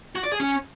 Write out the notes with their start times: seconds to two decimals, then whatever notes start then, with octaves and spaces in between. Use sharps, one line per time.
0.15 F#4
0.23 D5
0.32 G#4
0.40 C#4